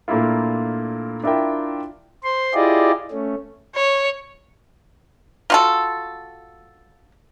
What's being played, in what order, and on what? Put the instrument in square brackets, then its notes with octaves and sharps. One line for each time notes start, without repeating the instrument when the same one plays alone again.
[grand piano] A#2 A3 A#3 D4 E4 F4
D4 E4 F4 A#4 E5 G5
[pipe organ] C5 C6
E4 F4 G4 G#4 D5 D#5
A3 C#4
[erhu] C#5
[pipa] F4 F#4 A4